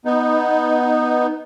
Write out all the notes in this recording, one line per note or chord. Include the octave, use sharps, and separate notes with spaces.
B3 D#4